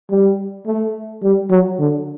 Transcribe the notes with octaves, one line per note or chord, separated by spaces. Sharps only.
G3
A3
G3
F#3
D3